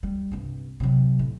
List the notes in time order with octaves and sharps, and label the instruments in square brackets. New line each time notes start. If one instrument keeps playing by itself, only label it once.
[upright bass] G3
C2 G2
C3 F#3
A2